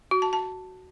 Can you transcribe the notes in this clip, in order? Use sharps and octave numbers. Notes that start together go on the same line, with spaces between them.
F#4
A5
A5